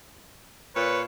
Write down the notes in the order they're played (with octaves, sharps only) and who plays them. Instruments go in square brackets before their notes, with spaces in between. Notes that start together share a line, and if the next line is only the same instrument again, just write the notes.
[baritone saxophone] A#2 [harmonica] B4 C#5